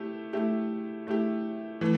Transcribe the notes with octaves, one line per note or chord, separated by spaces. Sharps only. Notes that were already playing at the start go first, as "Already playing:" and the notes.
Already playing: A3 E4 G4
A3 E4 G4
A3 E4 G4
E3 A3